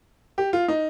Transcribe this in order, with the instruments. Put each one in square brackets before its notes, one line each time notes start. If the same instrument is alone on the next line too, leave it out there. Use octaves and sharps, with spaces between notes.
[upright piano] G4
F4
D#4